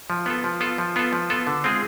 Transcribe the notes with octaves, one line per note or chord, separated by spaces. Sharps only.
F3
B3 F4 A4
F3
B3 F4 A4
F3
B3 F4 A4
F3
B3 F4 A4
D3
G#3 C4 F4 G#4